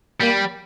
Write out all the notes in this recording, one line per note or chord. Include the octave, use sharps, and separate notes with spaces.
G3 A#3